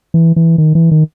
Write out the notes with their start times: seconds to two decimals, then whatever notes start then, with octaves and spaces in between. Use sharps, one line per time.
0.14 E3
0.36 E3
0.58 D#3
0.75 E3
0.91 D#3